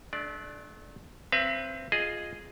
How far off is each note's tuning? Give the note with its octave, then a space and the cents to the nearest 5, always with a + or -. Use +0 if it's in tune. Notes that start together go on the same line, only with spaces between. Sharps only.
A3 -35 D4 +10 D5 +0
C4 +10 B4 +0 E5 +45
F4 +0 G#4 +0 D#5 +0